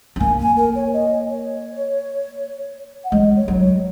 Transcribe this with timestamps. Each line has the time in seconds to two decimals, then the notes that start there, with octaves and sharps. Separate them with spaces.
0.16 C#4
0.20 A#3 G#5
0.39 G#5
0.56 A#4
0.75 C#5
0.93 D#5
1.29 C#5
3.04 F#5
3.12 G#3 D#5
3.36 C#5
3.48 F#3
3.60 C#5